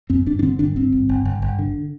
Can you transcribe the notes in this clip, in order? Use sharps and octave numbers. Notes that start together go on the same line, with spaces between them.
F#2 C4
G1 D4
D4
D3 C4
G1 D4
G1 C4
G1
G1
G1
G1
D3